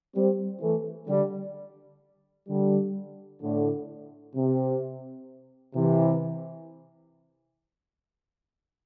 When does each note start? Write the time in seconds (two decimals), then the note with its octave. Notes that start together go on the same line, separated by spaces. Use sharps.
0.16 G3 C4
0.62 E3 A3
1.09 D3 G3
2.49 D3 G3
3.42 A2 D3
4.36 C3
5.75 C3 E3